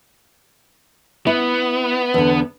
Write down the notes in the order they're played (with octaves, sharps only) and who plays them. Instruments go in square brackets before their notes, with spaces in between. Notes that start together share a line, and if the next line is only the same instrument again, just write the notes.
[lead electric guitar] B3 [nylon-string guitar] E4
[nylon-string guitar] E2 D3